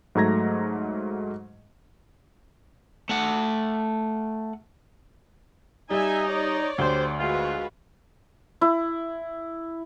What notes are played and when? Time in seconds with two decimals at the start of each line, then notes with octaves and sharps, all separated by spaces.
0.15 G#2 F#3 A3 A#5 G#6 A#6
3.09 A3 F#5
5.90 G3 D#4 E5 G#5
6.28 C#5 D5
6.78 D2 G4 C5
7.18 G#3 F4 F#4 B4
8.61 E4